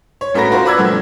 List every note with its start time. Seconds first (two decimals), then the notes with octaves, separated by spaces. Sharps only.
0.21 C#5
0.34 A1 A3 F#4 A#4 B4 A#6
0.51 F4 F#4 A#4 C5 F5
0.65 B4 D5 F#5 E6 G#6
0.78 G2 F3 A3 C4